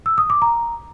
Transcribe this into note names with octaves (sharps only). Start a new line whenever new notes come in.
E6
D#6
D6
A#5